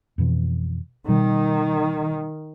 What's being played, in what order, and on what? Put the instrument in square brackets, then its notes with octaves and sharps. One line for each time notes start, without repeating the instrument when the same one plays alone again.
[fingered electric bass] F2 B2 E3
[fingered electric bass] B2 G3 [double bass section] D#3